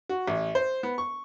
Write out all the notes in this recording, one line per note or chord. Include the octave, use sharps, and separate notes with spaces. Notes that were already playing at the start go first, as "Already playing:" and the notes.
F#4
A1
C5
B3
C#6